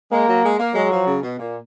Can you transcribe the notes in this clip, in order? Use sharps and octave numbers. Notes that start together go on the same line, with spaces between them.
G#3 A#3
F#3
G#3
A#3
F#3 G#3
F3
C#3
B2
A#2